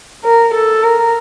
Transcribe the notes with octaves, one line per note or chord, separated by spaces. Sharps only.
A#4
A4
A#4